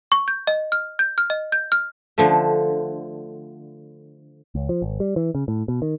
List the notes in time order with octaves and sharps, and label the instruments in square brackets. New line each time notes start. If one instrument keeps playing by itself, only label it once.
[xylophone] C#6
G6
D#5
F6
G6
F6
D#5
G6
F6
[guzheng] D3 F3 A3
[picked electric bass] C#2
F3
G#1
G3
E3
C#3
A2
B2
D#3